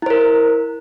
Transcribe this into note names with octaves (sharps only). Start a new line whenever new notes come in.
E4 A#4 C5